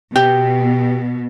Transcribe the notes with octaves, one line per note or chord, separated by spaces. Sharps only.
B2 G4